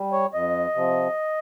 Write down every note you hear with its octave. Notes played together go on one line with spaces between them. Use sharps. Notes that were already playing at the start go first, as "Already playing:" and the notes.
Already playing: G3
C#5
F2 D#5
C3 F3